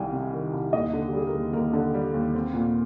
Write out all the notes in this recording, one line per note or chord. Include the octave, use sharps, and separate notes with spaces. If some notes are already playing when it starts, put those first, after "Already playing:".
Already playing: C2 C3 D#3 G3 F5 G5 G#5
C3
D#3
C2
D#2 D#5
D3
G4
G3 G#4
A#4
D#2
D#2 A#4
D3
G3
D#2
C4
A#2